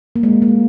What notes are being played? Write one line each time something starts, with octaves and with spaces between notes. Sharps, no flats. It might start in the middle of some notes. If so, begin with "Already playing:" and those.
A#3
G#3
A#3